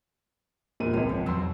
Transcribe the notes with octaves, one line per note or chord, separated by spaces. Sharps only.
E1 A#2 D#7
G#1 C#2 C#4
F3
F2 B2 F#3 C6 E6